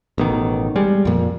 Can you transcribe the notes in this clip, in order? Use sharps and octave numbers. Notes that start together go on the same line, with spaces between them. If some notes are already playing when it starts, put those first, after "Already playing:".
A1 B2 D#3
G3 G#3
F2 A#2